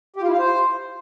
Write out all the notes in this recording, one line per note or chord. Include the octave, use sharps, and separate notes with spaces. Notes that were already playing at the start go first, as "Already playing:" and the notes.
G4
F4
E4
F5
C5